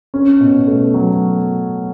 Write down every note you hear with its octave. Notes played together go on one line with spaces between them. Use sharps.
C#4
B2
A3
F#3